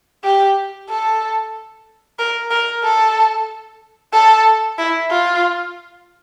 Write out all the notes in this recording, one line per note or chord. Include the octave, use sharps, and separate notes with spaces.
G4
A4
A#4
A#4
A4
A4
E4
F4